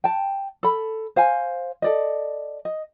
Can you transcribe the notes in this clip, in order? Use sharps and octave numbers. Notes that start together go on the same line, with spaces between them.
G5 A5
A4 B5
C5 F5 G#5
A4 D5 D#5
D#5